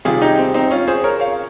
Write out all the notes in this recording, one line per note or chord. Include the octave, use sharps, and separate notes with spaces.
C3 D#3 G3 F4 G#4
D#4 G4
C4
C4 D#4
C#4 F4
G#4 C5
A#4 C#5
C#5 F5